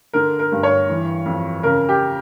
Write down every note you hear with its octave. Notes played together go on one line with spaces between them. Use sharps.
D3 A#4
A#4
G2
C#5
E3
F2
C#3 A#4
G4